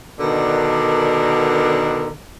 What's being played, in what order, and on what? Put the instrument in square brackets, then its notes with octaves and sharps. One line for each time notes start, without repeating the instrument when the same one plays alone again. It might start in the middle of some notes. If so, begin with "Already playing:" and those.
[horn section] B2 D3 D#3 D4 A#4